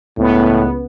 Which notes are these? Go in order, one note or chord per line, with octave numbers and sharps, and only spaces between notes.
C#2 A2 B3